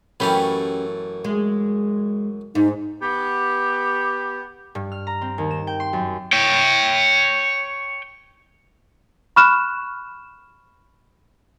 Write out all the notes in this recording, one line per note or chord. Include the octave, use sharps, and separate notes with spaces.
F#2 E3 A3 C#4 G4 B4
G#3
G#2 D#4
B3 G4
G2
F6
A#5
C4
D#2
E7
G5
C6
F#2
C#5 G5
B5 C#6 F6 F#6 E7